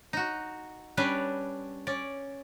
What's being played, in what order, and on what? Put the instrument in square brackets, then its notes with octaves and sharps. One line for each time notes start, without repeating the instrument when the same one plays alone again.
[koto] D#4 F#4
G3 C#4 D4 B4 D5
C#4 D5